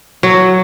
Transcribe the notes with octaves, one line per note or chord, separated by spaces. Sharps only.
F#3